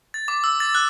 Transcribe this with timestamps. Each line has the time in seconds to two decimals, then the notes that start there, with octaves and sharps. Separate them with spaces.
0.14 A6
0.28 D6
0.44 E6
0.60 A6
0.75 F#6